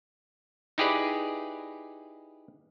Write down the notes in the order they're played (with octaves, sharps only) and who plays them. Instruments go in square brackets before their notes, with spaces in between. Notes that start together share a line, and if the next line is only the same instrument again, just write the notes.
[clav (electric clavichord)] D#4 E4 G4 G#4 B4 D5